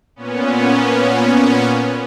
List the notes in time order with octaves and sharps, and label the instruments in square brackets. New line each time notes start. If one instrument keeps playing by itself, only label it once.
[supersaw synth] A#2 B3 C#4